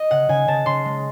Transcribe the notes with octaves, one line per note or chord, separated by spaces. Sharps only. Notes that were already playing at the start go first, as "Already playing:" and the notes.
Already playing: D#5
C#3 F#5
C#3 G#5
C#3 A5
C#3 C6
G#3